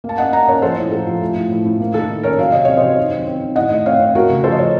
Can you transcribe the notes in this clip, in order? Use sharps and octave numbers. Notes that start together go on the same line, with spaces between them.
A#3
A5
C#4 D#5 F#5
A#3 F#5 A#5
C#4 A#4 C#5
F3 A4 C5
A2
F3 A4
F3
A3
A2
A2
A2
A#3
D#3 A4
D#3
C#4 A#4 C#5
F#3 F5
C3 D#5
C4 C#5
C5 D#5
F#3
D#3
C4
C4
D#3
A2 D#5 F#5
A3
C4 C#5 F5
C4
A3 F#4 A#4
C#3
F3 A4 C5
D#5
F3 C#5